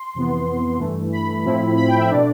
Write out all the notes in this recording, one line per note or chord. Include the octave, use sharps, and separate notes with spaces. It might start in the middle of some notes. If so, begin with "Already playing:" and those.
Already playing: C6
F2 C3 E3 B3
G2 E3 A3
B5
A2 F3 A3 C4 E4
B5
G5
E5
B2 A3 D4 D5